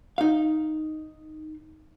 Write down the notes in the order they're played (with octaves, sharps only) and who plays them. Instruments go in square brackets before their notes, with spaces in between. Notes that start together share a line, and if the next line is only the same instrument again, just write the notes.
[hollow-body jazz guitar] D#4 F5